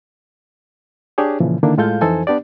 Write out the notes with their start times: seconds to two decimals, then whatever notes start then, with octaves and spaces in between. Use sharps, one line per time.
1.18 D4 G4 G#4 C#5
1.40 A#2 C#3 E3 F3
1.63 D3 D#3 A#3 D4 E4
1.78 A2 G#3 F4 A4 F5 G6
2.01 F2 E3 D#4 A4 C5 G#5
2.27 B3 D4 G4 D5